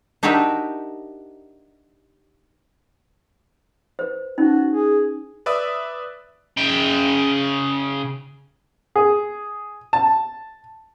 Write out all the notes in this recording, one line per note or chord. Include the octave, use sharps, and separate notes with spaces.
D4 D#4 F#4 G4 A#4 E5
B4 C5
C#4 D#4 F#4
G#4
B4 D5 E5 D#6 E6
C#3 G5
G#4
A5